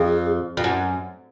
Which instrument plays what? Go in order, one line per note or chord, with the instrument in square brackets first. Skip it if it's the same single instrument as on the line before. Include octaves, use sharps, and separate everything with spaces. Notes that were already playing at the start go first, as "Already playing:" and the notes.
Already playing: [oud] F2 [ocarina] G#4
[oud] F2
F#2